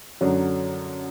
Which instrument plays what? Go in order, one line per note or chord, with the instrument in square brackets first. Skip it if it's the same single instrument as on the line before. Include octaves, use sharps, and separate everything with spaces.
[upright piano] F#2 D3 F#3